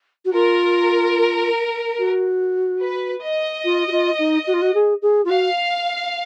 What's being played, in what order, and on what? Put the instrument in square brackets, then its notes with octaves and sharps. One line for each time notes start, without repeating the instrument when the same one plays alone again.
[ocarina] F#4
[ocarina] F4 [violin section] A#4
[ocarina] F#4
[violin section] B4
D#5
[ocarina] F4
F#4
F4
D#4
F#4
F4
F#4
G#4
G#4
F4
[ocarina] F#4 [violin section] F5